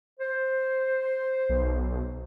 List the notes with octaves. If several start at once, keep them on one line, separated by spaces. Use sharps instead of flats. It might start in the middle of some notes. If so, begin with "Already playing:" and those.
C5
B1